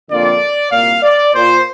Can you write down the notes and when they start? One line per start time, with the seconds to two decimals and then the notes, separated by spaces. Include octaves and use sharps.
0.09 F2 D3 A#3 F4 D5
0.71 C2 A#2 A#3 F5
1.03 D5
1.33 A#2 A#3 F4 C5